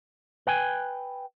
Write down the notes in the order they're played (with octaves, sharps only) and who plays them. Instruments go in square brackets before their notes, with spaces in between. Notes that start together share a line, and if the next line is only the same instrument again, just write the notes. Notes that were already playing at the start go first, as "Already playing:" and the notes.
[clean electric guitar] B4 G5 G#5